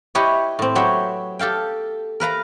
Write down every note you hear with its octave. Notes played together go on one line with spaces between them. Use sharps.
E4 G4 B4 C#5 D#5
A2 C4
F#3 B3 G4 C#5 E5 G5
G4 A4 F5 G5
A#4 B4 F5 A#5